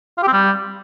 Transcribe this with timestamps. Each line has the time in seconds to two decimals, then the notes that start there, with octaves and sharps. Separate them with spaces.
0.17 F4
0.23 G4
0.28 C4
0.33 G3